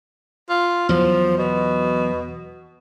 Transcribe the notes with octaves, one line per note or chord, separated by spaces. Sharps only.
F4
E2 F3 F#3
B2